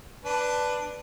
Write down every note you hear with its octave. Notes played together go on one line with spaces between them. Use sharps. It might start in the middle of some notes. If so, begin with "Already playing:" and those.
D4 B4